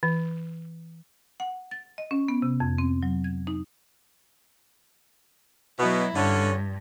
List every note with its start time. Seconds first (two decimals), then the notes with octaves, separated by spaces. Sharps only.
0.03 E3
1.40 F#5
1.71 A6
1.98 D#5
2.11 C#4
2.28 B3
2.42 C3
2.60 F2
2.78 C4
3.03 F#3
3.24 G#6
3.47 D#4
5.79 B2 F#3 E4
6.15 G2 D3 C#4